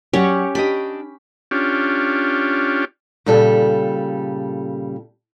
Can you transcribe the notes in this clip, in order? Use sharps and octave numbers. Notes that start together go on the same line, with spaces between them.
F#3 C#4 G4 C#5 D5 F#5
D4 G4 D#5 B5
C#4 D4 F4 G4
A#2 C#3 G3 A4